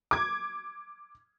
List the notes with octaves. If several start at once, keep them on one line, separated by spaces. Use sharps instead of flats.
D6 G#6